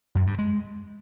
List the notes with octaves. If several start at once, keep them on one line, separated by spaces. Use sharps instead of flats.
F#2
G2
G#3